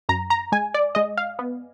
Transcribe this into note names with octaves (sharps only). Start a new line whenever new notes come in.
F#2 A#5
A#5
G#3 G#5
D5
G#3 D#5
F5
B3